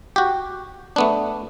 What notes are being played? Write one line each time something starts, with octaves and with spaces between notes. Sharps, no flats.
F#4 G4
A3 B3 D4